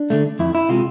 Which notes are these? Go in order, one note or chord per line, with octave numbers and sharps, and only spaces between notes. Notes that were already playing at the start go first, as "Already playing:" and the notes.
Already playing: D4
D3 A3
F2 E4
E4
C3 G#3 F4